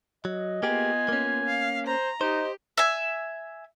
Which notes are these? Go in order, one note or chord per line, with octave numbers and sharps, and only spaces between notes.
F#3 D#5
A#3 B3 F4 G4 G#4 G#5
A#3 C#4
F5
C5 A#5
D#4 G4 C5 D#5
E5 G#5